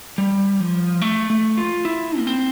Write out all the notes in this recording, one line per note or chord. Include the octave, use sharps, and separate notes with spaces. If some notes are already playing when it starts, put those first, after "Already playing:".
G3
F3
A3
A3
F4
E4
A#3
C4